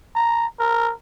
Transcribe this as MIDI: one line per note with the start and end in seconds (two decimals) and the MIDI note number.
0.15 0.46 82
0.60 0.92 70